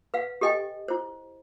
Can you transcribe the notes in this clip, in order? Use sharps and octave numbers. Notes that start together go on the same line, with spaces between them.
B4 F5 F#5
G4 A4 D#5 G5 G#5
E4 C5